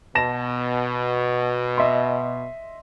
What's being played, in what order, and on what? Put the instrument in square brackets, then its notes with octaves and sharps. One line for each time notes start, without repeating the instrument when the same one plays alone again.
[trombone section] B2 [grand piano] A5 A#6 E7
[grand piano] D#5 E5 C6